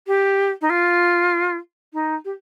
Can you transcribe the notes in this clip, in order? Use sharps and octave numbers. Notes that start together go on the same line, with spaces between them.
G4
D#4
F4
D#4
G4